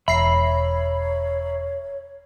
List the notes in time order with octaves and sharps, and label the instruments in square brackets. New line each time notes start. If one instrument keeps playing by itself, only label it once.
[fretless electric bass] E1 [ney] C#5 [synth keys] E5 A#5 C7 [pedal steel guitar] B5